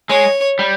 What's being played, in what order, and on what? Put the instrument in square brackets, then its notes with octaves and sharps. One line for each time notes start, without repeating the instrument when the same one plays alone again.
[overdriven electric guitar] G#3 [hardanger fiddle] C#5
[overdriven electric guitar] G3